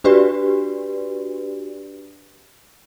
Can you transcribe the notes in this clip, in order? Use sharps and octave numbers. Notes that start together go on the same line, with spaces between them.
D4 F#4 G4 B4 D5